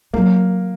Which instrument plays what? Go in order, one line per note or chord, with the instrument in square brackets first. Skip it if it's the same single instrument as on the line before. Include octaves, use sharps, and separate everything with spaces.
[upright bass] F#3 [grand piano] A#3